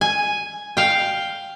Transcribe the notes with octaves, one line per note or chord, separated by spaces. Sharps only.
G#5
F5 G5